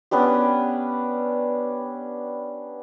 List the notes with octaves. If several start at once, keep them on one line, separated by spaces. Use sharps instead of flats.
B3 C#4 D4 G4